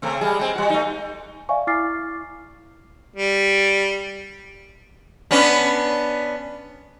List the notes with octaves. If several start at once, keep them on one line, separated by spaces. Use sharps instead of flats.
C#3 A3 C4
G3 G#3 G#4
G#3 C4
G3 F#4
A3 D#4
D5 E5 F5 G#5 C#6
E4 D6 F6 A6 C7
G3
B3 C#4 D4